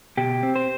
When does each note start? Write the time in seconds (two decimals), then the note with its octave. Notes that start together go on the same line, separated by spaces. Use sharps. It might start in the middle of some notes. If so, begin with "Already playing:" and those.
0.17 B2 G4
0.43 C4
0.56 C5